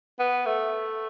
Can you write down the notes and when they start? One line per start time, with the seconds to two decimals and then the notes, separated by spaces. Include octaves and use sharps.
0.19 B3
0.46 A3